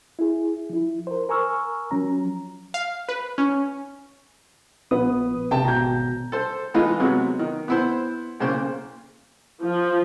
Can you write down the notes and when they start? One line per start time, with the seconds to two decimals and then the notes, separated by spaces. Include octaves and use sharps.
0.19 E4 G#4
0.70 F3 E4
1.07 A#4 C5
1.29 A#4 G#5 A#5 C#6 E6 F6
1.91 F3 F#3 C#4 A#5
2.74 F5
3.09 B4
3.38 C#4
4.91 A#1 B3 B4 D#6
5.51 G#1 C3 G5 A5
5.65 B2 A#5 G6
6.32 A4 C5
6.74 E3 G#3 A3 D#4 F4 B4
7.00 C3 F#3 G#3 B3
7.39 D#3
7.68 B3 E4 C5
8.40 B1 C#3 A#3 C5
9.62 F3